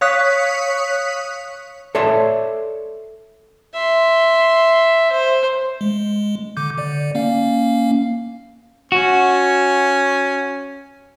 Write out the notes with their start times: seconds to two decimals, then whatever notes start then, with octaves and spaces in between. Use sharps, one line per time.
0.01 C#5 F5 C#6 D#6 F#6 B6
1.95 A4 C#5 D5 E5 A5 C6
3.74 E5 C6
5.12 C5
5.81 G#3
6.57 D3 D6 G6
6.78 D3 D5
7.15 A#3 C#4 F5
8.92 C#4 F#4